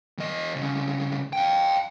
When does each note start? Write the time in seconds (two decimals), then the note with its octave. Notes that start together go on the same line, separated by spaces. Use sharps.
0.18 E2 D#5
0.56 C2 C#3
1.33 F5 G5